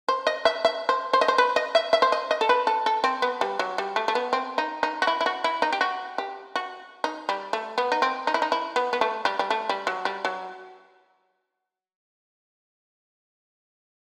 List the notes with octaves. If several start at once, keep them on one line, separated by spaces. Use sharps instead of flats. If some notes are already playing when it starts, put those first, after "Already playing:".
C5
D#5
E5
E5
C5
C5
D#5
C5
B4
D#5
E5
E5
C5
D#5
D#5
A4
B4
A4
A4
C4
B3
G3
F#3
G3
A3
A3
B3
C4
D#4
D#4
F#4
E4
E4
F#4
E4
D#4
G4
F#4
G4
F#4
D#4
G3
A3
B3
D#4
C4
D#4
E4
D#4
E4
B3
B3
A3
G3
G3
A3
G3
F#3
G3
F#3